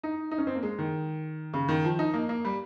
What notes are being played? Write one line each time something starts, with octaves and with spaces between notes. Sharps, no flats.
D#4
D#4
C#4
C4
A#3
G#3
D#3
C#3
D#3
F3
D#4
A#3
A#3
G3